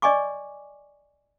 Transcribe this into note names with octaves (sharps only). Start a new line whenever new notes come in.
D5 D#5 G#5 C#6 D6